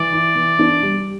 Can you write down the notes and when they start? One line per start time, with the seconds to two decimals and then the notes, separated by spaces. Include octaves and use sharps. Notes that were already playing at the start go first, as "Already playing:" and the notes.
Already playing: E3 D5
0.12 E4
0.35 E3
0.59 D4
0.82 G3